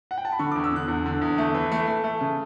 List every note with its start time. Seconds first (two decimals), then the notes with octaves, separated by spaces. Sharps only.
0.11 F#5
0.18 G5
0.25 A5
0.32 B5
0.39 D3 C#6
0.52 D6
0.56 E2
0.64 E6
0.72 D3 F#6
0.88 E2
1.06 D3
1.21 E2
1.38 A3
1.54 E3
1.72 A3
1.88 A3
2.04 A3
2.21 C#3